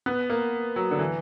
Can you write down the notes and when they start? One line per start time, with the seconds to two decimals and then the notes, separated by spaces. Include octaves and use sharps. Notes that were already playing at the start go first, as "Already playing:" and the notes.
0.06 B3
0.30 A#3
0.76 F#3
0.91 D3
0.99 E3